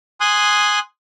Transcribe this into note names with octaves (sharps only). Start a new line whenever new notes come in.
G#5 C6 D#6 F#6